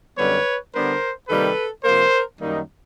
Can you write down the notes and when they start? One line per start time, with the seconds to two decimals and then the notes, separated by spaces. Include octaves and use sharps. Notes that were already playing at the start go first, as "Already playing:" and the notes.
0.18 F#2 D3 G3 B3 B4 C#5
0.74 D3 G3 B3 D4 A#4 C5
1.29 C3 D#3 G3 A#3 A4 B4
1.84 C3 F3 A#3 A#4 C5
2.41 F#2 D#3 G3 A#3 D#4